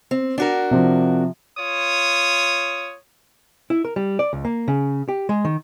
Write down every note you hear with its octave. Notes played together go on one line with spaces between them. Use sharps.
C4
D4 F#4 A#4
C3 F3
F4 C#5 D#6
E4
A#4
G3
D5
C#2
A#3
C#3
G4
G#3
D#3